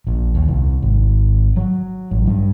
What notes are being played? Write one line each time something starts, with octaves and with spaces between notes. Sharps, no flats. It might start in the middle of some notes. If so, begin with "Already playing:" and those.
A#1
D#2
C2
G#1
F#3
A1
G2